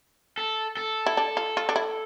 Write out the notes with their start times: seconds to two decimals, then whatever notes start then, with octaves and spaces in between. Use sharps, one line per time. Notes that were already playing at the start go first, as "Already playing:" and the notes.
0.38 A4
0.77 A4
1.06 E4
1.17 D4
1.37 F4
1.57 F4
1.69 D4
1.76 E4